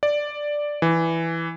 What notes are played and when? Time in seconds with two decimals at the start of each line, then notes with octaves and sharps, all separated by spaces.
0.03 D5
0.82 E3